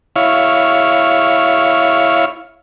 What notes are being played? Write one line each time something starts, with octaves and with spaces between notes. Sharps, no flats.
E4 C#5 F5